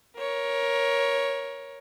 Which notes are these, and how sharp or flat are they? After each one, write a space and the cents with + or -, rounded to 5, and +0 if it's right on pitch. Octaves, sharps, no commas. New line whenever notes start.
A#4 +15 C#5 +0